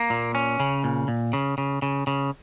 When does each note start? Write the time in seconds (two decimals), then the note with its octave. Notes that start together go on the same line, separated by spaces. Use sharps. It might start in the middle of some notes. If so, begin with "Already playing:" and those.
Already playing: A#3
0.10 A#2
0.35 C#4
0.60 C#3
0.84 A#2
1.08 A#2
1.33 C#3
1.58 C#3
1.82 C#3
2.07 C#3